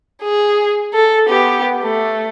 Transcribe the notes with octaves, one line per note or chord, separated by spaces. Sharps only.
G#4
A4
B3 G4
A3